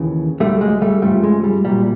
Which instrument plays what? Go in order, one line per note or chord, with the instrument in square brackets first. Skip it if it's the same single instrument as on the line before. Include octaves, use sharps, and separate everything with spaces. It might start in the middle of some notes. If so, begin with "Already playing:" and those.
Already playing: [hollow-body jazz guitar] D#2 C#3 E3
D2 D3 F#3 G3 A3
G#3
G3 A3
F#2 C#3 F3 G3 A3
G#3
G3
C2 A#2 F#3 G3